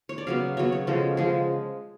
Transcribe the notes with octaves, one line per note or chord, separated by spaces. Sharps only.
C#5
D5
C#3 F#3 B3 F5
C#3 F#3 B3 C#5
C#5
C#3 F3 G#3 A4
C#3 F3 G#3 G#4